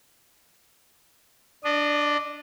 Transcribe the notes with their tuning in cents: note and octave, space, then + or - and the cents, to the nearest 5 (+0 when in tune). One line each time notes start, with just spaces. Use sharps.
D4 +0 D#5 -30